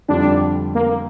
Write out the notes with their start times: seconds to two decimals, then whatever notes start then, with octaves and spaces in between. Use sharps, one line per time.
0.08 F2 D3 G3 D4
0.75 A#3